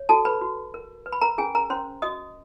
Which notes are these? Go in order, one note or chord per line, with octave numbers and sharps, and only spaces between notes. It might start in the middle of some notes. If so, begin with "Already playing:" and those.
Already playing: C#5
F#4 A4 A5
B4 B5
F#4
A#4
B4
B5
A#4 A#5
C#4 G#4 G#5
A#4 A#5
C#4 C5 C6
F#4 D#5 D#6